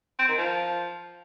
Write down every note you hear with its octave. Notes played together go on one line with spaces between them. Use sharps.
C4
D#3
F3